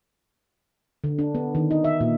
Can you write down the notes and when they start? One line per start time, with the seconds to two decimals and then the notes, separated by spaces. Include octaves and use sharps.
1.04 D3
1.19 D4
1.35 B3
1.55 D#3
1.71 D#4
1.84 E5
2.01 A#2